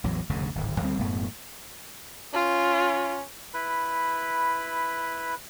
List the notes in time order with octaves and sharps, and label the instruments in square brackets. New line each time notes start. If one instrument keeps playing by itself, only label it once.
[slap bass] A1 E2 F#3
F1 D2 G2 C#3
D1 G#1
D2 G3 C4
E1 F#2 A2 B3
[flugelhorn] C#4 [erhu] F4
[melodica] E4 B4 B5